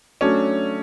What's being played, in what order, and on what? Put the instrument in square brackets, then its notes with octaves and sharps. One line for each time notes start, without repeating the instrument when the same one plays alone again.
[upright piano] F#3 A3 D4 [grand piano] C#4